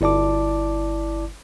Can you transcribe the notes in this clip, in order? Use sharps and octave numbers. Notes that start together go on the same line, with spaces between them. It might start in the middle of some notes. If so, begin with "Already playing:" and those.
G1 E4 D5 A5 D6